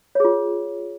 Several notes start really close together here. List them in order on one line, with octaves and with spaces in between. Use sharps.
C#5 G#4 F4